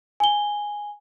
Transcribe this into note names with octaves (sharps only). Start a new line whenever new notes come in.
G#5 G7